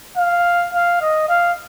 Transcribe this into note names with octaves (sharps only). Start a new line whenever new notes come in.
F5
F5
D#5
F5